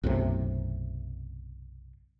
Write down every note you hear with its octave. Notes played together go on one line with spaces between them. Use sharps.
B1 F#2 A2 C3